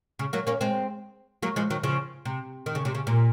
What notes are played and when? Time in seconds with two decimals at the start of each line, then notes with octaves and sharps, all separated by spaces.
0.19 C#3
0.33 F#3 A#3
0.47 A#3 C#4
0.61 G#3 C4
1.42 F#3 A#3
1.56 F3 G#3
1.70 D#3 F#3
1.83 C#3 F3
2.25 C3
2.66 D#3
2.75 C#3
2.85 C3
2.95 C#3
3.07 A#2